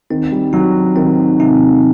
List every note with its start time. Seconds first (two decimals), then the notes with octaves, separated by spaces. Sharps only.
0.10 D#3 C4
0.32 G3
0.53 F#3 D#4
0.96 D#3 C4
1.39 C3 D#4